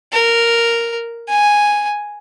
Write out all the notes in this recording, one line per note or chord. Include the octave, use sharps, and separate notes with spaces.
A#4
G#5